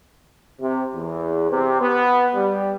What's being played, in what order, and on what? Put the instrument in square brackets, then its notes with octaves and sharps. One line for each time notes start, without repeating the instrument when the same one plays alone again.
[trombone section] C3
E2
C3
B3
G3